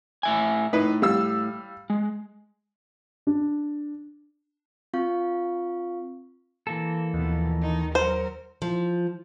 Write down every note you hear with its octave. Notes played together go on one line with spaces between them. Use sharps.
A2 E5 G#5
A2 D#4 E4 B4
G3 F5 E6
G#3
D4
C4 F4 F5 C#6
E3 A#3 A4
D#2 B2 F3
D#3 D#4
F#3 A#4 C5
F3